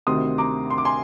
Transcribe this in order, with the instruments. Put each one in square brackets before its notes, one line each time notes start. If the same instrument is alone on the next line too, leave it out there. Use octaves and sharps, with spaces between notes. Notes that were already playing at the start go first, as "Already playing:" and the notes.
[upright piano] D2 C3 D#3 C6 D#6
A#5 D6
C6
D6
G#5 C6